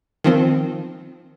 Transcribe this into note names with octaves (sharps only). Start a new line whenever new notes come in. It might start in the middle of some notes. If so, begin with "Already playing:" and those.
D#3 F3 C4